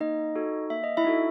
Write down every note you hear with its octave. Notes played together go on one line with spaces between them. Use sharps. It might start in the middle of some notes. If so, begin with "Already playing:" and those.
A#3 D#4 D#5
D#4 F#4 A4
A#3 E5
D#5
E4 E5
D#4 F#4 A4